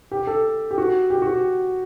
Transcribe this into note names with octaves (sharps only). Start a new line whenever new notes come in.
G4
A4
G4
F#4
G4
F#4
G4